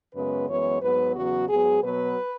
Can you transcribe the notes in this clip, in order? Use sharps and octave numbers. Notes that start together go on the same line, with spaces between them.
F#2 C#3 G#3 B3 B4
F#2 E3 G#3 B3 C#5
G#2 F#3 B3 B4
E2 C#3 F#3 B3 F#4
G#2 F#3 B3 G#4
B2 F#3 B3 B4